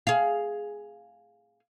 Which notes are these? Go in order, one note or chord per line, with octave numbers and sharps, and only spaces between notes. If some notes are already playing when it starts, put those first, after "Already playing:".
G#4 F5